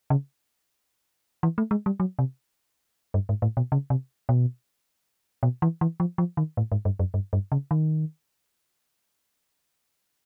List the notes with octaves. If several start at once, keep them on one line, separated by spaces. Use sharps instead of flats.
C#3
E3
A3
G#3
G3
F#3
C3
G2
G#2
A2
B2
C#3
C3
B2
B2
E3
E3
F3
F3
D#3
A2
G#2
G2
F#2
G2
G2
C#3
D#3